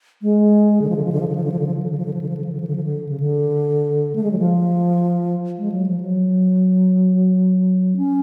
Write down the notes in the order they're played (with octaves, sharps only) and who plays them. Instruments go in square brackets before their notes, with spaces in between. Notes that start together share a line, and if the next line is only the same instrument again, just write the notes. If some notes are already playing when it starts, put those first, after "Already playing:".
[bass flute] G#3
D3
F3
D3
F3
D3
F3
D3
F3
D3
F3
D3
F3
D3
F3
D3
F3
D3
F3
D3
F3
D3
F3
D3
F3
D3
F3
D3
C#3
D3
A3
G#3
F#3
F3
G#3
F#3
F3
F#3
C#4